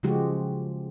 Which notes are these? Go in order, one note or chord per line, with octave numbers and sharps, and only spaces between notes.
C#3 F3 G#3 F#4 G4